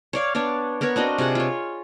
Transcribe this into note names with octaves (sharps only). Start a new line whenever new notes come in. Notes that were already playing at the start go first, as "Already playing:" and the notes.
C#5 D5 F5
B3 D4 C#5 D5
B3 A#4 B4 C#5
C4 D4 F#4 D#5
C3 F4 G#4 F#5
F4 C#5